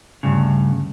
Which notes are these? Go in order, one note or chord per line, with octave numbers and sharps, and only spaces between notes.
D2 G2 C#3